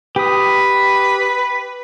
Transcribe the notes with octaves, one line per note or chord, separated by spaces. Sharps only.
G4 B4 D#6